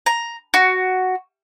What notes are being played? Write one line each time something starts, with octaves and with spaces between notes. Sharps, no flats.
A#5
F#4